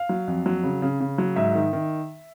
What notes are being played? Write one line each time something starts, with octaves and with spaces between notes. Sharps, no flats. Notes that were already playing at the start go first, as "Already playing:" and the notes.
Already playing: F5
F#3
F2
F#3
C#3
C#3
C#3
F#3
G#2 E5
D#3
D#3